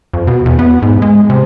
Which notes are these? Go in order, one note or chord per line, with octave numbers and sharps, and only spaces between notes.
F2
B2
E2
B3
G#2
G#3
C3